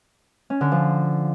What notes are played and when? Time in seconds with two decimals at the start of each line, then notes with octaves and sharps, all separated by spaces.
0.50 C#4
0.61 D3
0.72 F3